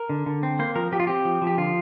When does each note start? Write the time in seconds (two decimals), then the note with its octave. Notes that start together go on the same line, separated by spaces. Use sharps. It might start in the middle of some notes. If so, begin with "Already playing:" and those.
Already playing: A#4
0.09 D3
0.26 D3
0.43 C4
0.59 A#3 C5
0.75 F3 A#4
0.92 F3 G4
1.00 F4
1.07 C4 G4
1.25 F3
1.42 F3
1.47 G4
1.58 D3 F4